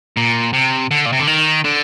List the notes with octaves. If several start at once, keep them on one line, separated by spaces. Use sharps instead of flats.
A#2
C3
D3
A#2
C3
D3
D#3
D3